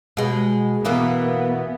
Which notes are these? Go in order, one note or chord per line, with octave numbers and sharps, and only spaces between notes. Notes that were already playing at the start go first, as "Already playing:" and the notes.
B2 G#3
B2 E3 A#3 B3